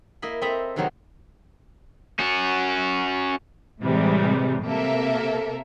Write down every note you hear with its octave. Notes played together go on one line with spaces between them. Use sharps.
A#3 E4 D#5 B5
C4 A4 D#5 E5 A#5 B5
C3 D#3 F3 F#3 A#3 B3
C#4 F#4
A2 C3 E3 G3 G#3
C3 A#3 A4 A#4 E5